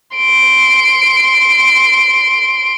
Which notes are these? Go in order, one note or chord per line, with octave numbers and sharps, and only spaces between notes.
C6 D7